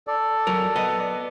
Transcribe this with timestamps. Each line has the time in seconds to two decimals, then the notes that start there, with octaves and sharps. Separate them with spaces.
0.07 A4 D5
0.47 F#3 A#4
0.76 B3 D#5